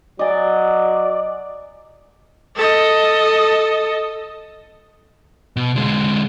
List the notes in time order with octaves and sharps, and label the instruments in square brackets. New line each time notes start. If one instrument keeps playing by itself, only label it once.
[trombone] F#3 [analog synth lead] D5 [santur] D#5 G#5
[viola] A4 D#5
[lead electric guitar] B2
D3 G#3